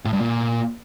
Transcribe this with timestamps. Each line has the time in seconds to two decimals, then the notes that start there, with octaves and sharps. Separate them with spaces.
0.05 A2
0.13 G2
0.20 A#2